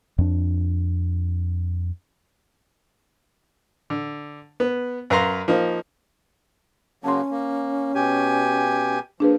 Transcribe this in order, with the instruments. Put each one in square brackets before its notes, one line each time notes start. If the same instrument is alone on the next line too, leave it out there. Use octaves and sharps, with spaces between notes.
[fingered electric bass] F2 D4
[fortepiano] D3
B3
F#2 B4 F5 A#5 C6
F3 A#3 D#4
[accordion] C#3 F#3 A#3 [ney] C#4 [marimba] A5 C6
[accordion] A#3
B2 G4 G#5
[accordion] F3 [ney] A#3 [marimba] D4 G#4 B4